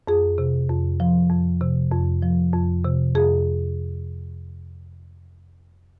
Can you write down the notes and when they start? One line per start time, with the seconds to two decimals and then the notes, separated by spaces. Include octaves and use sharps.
0.08 F2 G#4
0.38 C3
0.69 F2
1.00 F3
1.31 F2
1.61 C3
1.92 F2
2.22 F3
2.53 F2
2.85 C3
3.15 F2 G#4